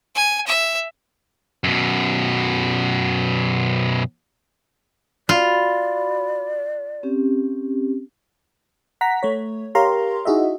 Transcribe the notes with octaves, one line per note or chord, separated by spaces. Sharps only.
G#5
E5
F#2 B2
F4 F#4 D5 B5
C4 C#4 G4
F#5 A#5 B6
A3 C#5
G4 A#4 C#5 F5 A#5 C6
D#4 E4 F#4 G#4 D#5 E5